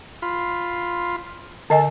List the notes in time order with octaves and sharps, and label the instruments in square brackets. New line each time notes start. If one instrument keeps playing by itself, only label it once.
[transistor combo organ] F4 B5 C6
[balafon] D3 D#5 G#5 [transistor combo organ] A4